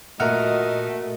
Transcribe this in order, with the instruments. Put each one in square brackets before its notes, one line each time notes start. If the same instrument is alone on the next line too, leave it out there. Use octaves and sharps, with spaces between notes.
[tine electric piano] A#2 F#5 F6 [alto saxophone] A3 [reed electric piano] F#4 A#4 E5 [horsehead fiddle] D#5